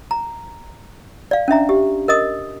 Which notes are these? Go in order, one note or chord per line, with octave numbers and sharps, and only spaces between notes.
A#5
D5 F5
C#4 D4 E5 A#5
G4
A#4 D#5 D#6